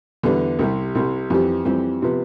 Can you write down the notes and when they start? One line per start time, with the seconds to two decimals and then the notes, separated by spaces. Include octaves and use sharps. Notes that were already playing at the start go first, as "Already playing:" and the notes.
0.23 E2 D3 G3 B3
0.59 C2 C3 G3
0.95 C2 C3 G3
1.30 F2 E3 G3 C4 G4
1.65 F2 E3 G3 C4 G4
2.02 C3 F3 B3